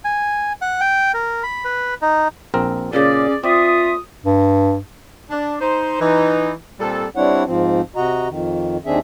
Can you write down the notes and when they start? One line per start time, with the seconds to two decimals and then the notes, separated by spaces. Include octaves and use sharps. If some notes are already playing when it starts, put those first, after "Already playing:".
0.05 G#5
0.61 F#5
0.81 G5
1.14 A#4
1.43 B5
1.65 B4
2.02 D#4
2.54 A#1 C4 A#4
2.93 A#2 C#3 C#4 G#4 D5
3.44 C4 F4 D5 E5 D#6
4.25 G2
5.31 D4
5.61 D#4 C5
6.01 E3 D#4
6.80 A#2 G3 C4 A4
7.15 G3 C4 D4 E4 C#5 F#5
7.47 G#2 F3 C4
7.96 C3 F#4 D#5 A#5
8.28 F2 D#3
8.86 D#2 D#3 C4 D4 G#4 E5